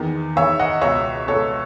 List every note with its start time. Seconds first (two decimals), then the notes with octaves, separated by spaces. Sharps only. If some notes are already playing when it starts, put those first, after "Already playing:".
Already playing: E2 D#3
0.36 E2 C#5 E5
0.40 D#3
0.59 D#5 F#5
0.81 C#2 B2 C#5 E5
1.27 C#2 B2 A4 C#5